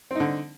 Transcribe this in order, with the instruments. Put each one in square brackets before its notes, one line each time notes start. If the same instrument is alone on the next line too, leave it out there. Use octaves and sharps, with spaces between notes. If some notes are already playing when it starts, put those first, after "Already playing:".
[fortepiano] C4
D#4
D3